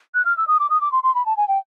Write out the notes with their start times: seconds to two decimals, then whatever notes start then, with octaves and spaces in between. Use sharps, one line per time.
0.14 F#6
0.25 F6
0.37 E6
0.47 D#6
0.60 D6
0.70 D#6
0.81 D6
0.92 C6
1.03 C6
1.15 B5
1.26 A5
1.37 G#5
1.48 G5